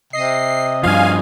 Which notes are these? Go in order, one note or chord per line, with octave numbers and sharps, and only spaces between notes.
C3 D#5 C7
G2 F3 F5 G#5